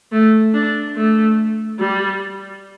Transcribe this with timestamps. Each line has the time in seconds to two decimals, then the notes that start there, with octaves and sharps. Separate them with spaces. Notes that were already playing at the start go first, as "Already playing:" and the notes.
0.12 A3
0.54 D4
0.96 A3
1.79 G3